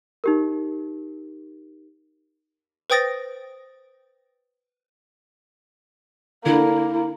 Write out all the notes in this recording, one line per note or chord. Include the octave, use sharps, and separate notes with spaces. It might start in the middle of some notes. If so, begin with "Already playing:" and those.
D#4 G4 A#4
B4 C5 G5 D#6 A6 A#6
D3 A#3 E4